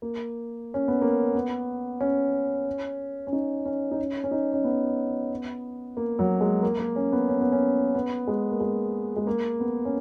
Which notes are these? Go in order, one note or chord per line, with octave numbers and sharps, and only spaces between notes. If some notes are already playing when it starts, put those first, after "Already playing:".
A#3
C#4
B3
A#3
B3
C#4
C#4
D#4
C#4
D#4
C#4
C#4
D#4
C#4
B3
A#3
F#3
G#3
A#3
A#3
C#4
B3
C#4
B3
C#4
B3
G#3
A#3
G#3
G#3
A#3
B3
C#4